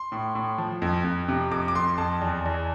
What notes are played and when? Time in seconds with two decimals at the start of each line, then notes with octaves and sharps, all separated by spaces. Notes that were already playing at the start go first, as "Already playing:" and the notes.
Already playing: C6
0.12 A2
0.35 A2
0.58 F3
0.82 F2
1.04 F2
1.28 C3
1.51 F2 D6
1.68 D6
1.75 F2 C6
1.98 F2 A5
2.21 E2
2.45 E2